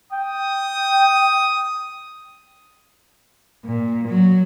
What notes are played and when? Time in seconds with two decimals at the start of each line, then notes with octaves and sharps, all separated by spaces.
0.12 G5 D#6
3.65 A#2
4.08 F#3